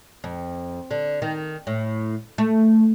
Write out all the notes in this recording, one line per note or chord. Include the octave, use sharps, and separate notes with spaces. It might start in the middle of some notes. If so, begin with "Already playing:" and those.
F2
D3
D#3
A2
A3